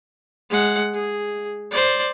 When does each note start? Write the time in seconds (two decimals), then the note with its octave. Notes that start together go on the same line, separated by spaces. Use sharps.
0.50 G#3 F#5
0.93 G#4
1.71 C5 D5